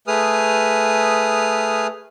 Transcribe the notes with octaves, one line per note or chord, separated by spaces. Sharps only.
A3 G#4 B4 D#6 F6